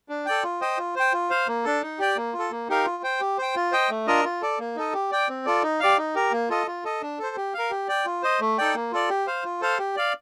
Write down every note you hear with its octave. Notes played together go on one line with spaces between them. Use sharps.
D4
A4 D5 G5
F4
C5 D#5 G5
F4
C5 G5
F4
C5 F5
A#3
D4 A4
D#4
G4 D5 G5
A#3
F4
A4
A#3
D#4 G4 A#4 F5
F4
C5 G5
G4
C5 G5
F4
C5 D#5 G5
A3
D4 F4 A#4 D#5
F4
A4 D5
A#3
D#4 A4 D#5
G4
D5 G5
C4
F4 A4 D5
D#4
G4 D5 F5
D#4
G4 A#4
A#3
F4 A4 D#5
F4
A4 D#5
D4
A4 C5
G4
A#4 F5
G4
D5 G5
F4
C5 D#5
A3
D#4 A4 D5 G5
A#3
F4 A4 D5
G4
C5 F5
F4
A4 C5 F5
G4
D5 F5